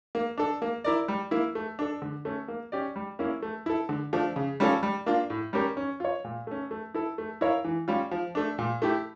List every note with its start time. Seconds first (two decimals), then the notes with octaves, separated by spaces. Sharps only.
0.15 A#3
0.38 D4 A4
0.62 A#3
0.84 E4 A#4 D5
1.08 G3
1.31 A#3 E4
1.55 A3
1.79 D4 A4
2.02 D3
2.25 A3 C#4
2.48 A#3
2.72 C#4 G4 D5
2.96 G3
3.19 A#3 C#4 E4
3.42 A3
3.66 E4 A4
3.89 D3
4.13 F3 A3 D4
4.36 C#3
4.60 G3 C#4 F4 A4
4.83 G3
5.06 A#3 D4 F4
5.30 A2
5.53 G3 C#4 G4 A#4
5.77 C#4
6.00 F4 C#5
6.24 A#2
6.47 A3 C#4
6.71 A3
6.94 E4 A4
7.18 A3
7.41 E4 A#4 C#5 F5
7.65 E3
7.88 G3 C#4 F4
8.11 F3
8.35 A3 D4
8.59 A#2
8.82 A3 E4 G4